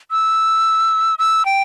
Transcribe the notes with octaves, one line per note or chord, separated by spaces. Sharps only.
E6
E6
G5